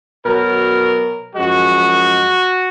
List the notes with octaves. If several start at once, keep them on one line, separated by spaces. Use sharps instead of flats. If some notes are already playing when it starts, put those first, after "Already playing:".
B2 F#3 A#4
F#2 F3 G#3 F#4